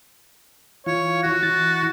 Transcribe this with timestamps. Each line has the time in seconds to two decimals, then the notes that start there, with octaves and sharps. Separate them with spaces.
0.86 E3 F4 C#5
1.23 F#4
1.43 E3 A6